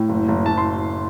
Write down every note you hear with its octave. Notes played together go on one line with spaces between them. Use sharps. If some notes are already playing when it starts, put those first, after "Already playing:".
Already playing: A2 G5
F#1
F#1
F#1 A5
C6